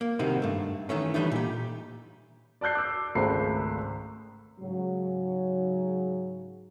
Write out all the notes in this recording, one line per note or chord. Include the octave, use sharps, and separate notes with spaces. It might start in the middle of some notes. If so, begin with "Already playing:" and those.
A#3
C2 C3 D#3 D#4 F#4 C5
G2 A3
D#3 E3 A3 C#4
E3 F#3 G3 A3 D4 D#4
A#2 G4
D5 A5 F#6 G6 C7
D6 E6
G#1 C#2 A3 C5 B5 C7
G#2 C#3 F#3